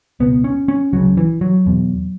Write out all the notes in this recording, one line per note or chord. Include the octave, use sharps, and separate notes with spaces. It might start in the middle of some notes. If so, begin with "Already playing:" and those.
C#2 B2 B3
C#4
C#4
C#2 C#3 F#3
E3
F#3
E2 B2